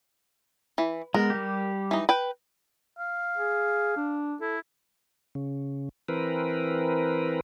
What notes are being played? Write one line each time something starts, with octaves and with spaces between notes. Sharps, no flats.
E3
G#3 B3 A#4
G3 G4
E3 D#4
B4 G5
F5
G#4
D4
E4 A4
C#3
E3 C4 A#4 B4